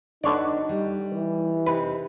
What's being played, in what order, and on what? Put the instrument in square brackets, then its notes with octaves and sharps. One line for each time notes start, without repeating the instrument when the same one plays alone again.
[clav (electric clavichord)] D3 C#5 D5 [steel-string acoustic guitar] D4 F#4 B4 [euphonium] D#4
[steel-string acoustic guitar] G3
[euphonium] E3
[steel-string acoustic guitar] C3 C4 D#4 [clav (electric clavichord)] B4